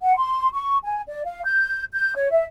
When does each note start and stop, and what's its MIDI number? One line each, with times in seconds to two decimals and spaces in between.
0.02 0.15 78
0.17 0.49 84
0.52 0.77 85
0.84 1.01 80
1.07 1.23 74
1.24 1.41 77
1.45 1.84 91
1.94 2.13 91
2.15 2.30 73
2.31 2.43 76